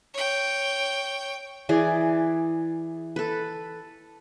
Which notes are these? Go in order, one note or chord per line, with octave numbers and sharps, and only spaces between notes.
C#5 G5
E3 G#4 D5
A4 B4